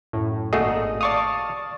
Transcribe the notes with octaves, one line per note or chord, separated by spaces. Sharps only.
F#2 A2
G#1 A#2 A3 F#4 G#4 D#5
D5 F5 A5 C#6 D#6